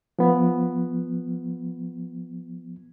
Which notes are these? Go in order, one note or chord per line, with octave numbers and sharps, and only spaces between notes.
F3 B3